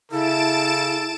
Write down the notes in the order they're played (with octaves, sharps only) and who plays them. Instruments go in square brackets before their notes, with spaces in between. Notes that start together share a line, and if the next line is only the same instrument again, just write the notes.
[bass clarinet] C#3 [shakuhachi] E4 [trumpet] A4 [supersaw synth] A5 D7 E7